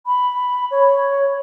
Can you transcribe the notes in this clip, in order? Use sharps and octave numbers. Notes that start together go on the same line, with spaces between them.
B5
C#5